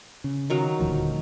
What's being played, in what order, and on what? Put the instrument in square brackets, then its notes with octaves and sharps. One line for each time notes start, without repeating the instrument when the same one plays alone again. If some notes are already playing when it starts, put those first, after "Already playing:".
[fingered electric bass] C#3
[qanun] D#3 F#3 F5
[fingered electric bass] D#1 D2 F3